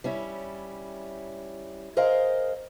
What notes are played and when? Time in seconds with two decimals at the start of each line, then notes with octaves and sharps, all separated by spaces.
0.04 G3 C#4 E4
1.97 G#4 A#4 C5 D#5 F5